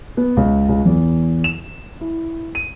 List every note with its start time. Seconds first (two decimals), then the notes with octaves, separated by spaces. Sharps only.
0.17 B3
0.37 C#2
0.69 C#2
0.85 E2
1.44 E7
2.01 E4
2.55 D#7